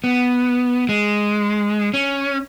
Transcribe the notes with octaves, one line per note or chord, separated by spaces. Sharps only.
B3
G#3
C#4